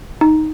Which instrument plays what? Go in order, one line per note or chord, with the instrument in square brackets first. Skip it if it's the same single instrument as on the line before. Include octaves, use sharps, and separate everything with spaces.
[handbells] D#4